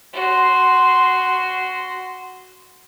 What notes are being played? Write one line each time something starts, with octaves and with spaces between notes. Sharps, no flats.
F#4 C6